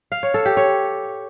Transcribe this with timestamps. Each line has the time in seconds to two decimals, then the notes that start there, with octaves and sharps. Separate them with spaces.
0.12 F5
0.23 C#5
0.34 A4
0.46 G4
0.57 C#5